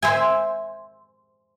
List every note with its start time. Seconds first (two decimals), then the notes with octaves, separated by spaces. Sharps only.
0.02 C5 E5 G#5